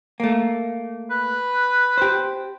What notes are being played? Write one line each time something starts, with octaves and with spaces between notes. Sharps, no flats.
A3 A#3
B4
G4 C5